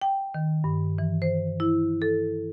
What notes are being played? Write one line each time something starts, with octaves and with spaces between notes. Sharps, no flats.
G5
D#3
G2
E3
C5
E4
A4